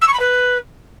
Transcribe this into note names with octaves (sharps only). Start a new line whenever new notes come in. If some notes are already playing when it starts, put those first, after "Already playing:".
E6
C#6
B5
B4